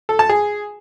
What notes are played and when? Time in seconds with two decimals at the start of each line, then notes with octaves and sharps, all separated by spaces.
0.09 A4
0.19 A5
0.29 G#4